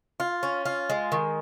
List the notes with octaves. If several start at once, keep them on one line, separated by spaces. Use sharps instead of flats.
F4
C#4
F4
G#3
D#3